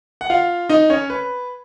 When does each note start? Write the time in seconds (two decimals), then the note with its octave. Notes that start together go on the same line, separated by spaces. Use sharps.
0.21 F#5
0.30 F4 F5
0.69 D#4 D#5
0.90 C#4 C#5
1.10 B4